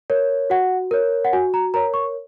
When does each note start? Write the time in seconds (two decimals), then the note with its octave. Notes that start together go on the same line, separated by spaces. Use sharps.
0.10 A#4 C#5
0.50 F#4 F#5
0.91 A#4 C#5
1.25 F#5
1.33 F#4 G#5
1.54 A#5
1.74 A#4 C#5 A#5
1.94 C#6